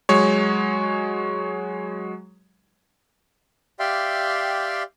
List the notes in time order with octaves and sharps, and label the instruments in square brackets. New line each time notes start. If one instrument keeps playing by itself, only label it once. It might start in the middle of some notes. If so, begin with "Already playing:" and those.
[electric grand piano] F#3 G#3 C#5
[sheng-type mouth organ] G4 D5 E5 F5 G5 C6